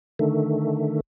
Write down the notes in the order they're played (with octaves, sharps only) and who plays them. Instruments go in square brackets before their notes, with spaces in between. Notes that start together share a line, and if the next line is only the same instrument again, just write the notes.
[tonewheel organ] D3 D#3 A3